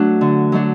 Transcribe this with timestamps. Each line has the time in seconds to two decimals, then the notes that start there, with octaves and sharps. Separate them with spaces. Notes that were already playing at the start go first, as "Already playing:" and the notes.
Already playing: F#3 A3 D4 F#4
0.21 D3
0.52 F#3 A3 D4